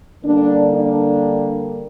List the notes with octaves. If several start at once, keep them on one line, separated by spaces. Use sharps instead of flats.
D3 G3 A#3 D4
D4